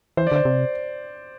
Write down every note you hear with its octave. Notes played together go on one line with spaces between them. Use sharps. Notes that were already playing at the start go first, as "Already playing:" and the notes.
E3 C5
D5
D3 C5
C3